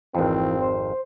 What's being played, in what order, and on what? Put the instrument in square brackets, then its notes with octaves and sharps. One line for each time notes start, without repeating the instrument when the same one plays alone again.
[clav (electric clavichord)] G#1 F2 [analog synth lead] E3 [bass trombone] C4
[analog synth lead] C5